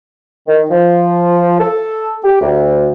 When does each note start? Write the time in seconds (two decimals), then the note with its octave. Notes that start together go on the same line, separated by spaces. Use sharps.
0.48 D#3
0.70 F3
1.60 A4
2.24 G4
2.41 D2